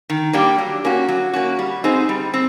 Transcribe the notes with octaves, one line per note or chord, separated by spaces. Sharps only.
D#3
G3 A#3 D4 G4
F#3
A#3 C#4 F#4
F#3
A#3 C#4 F#4
G3
C4 D#4 G#4 C5
G3
C4